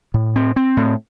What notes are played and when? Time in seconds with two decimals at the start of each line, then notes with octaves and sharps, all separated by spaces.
0.14 A2
0.36 C4
0.56 C4
0.77 A2